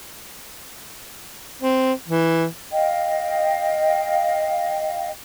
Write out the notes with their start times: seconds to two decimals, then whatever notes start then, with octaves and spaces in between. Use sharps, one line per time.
1.62 C4
2.08 E3
2.70 D#5 F5 G5